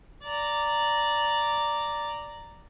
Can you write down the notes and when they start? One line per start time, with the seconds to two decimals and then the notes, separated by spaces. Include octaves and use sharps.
0.24 D5 A#5